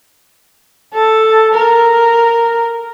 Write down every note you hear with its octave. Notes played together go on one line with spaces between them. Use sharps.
A4
A#4